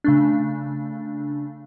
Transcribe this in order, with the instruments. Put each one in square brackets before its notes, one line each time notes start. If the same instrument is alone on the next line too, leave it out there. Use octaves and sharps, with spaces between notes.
[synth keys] C#3 A3 D4